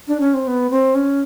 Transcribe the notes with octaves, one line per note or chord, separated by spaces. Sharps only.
D4
C#4
C4
B3
C4
C#4